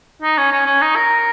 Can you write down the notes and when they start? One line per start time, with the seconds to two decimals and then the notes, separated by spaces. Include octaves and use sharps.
0.22 D#4
0.38 C#4
0.52 C#4
0.66 C#4
0.81 D#4
0.96 A#4